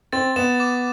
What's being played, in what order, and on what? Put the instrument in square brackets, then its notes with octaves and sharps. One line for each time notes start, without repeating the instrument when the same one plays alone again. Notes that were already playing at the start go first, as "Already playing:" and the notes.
[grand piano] C4 [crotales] A6
[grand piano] B3 [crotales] E7
[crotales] D6